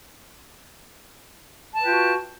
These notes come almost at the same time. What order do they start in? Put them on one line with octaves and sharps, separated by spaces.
A5 B4 G5 F4 F#4